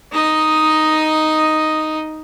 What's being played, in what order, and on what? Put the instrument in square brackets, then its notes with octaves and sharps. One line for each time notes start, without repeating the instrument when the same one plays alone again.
[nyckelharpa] D#4 D#5